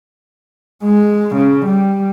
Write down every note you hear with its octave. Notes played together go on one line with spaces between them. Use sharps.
G#3
C#3
G3